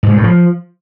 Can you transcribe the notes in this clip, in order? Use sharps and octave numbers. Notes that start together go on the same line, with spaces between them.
G#2
G2
A2
F3